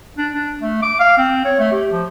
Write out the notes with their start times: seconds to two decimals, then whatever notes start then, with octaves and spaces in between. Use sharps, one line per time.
0.18 D4
0.34 D4
0.61 A3
0.83 D6
1.00 F5
1.17 C4
1.45 C#5
1.59 A3
1.72 G4
1.92 F3